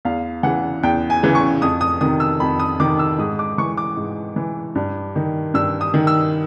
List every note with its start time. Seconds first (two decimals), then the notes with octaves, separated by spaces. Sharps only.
0.05 E2 F5
0.43 C#3 E3 F#5
0.83 E2 G5
1.10 G#5
1.23 C#3 E3
1.35 C#6
1.62 F2 D#6
1.81 D#6
2.01 C3 D#3 D#6
2.20 E6
2.40 F2 B5
2.60 D#6
2.80 C3 D#3 D6
2.99 E6
3.18 G#2 D#6
3.39 D6
3.58 E3 C#6
3.78 D6
3.97 G#2
4.36 E3
4.75 G2
5.16 D#3
5.54 G2 E6
5.81 D#6
5.94 D#3
6.07 E6